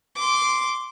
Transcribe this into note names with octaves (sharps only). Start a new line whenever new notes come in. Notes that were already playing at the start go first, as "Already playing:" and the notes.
C6 D6